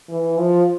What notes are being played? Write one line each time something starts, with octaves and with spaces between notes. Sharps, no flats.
E3
F3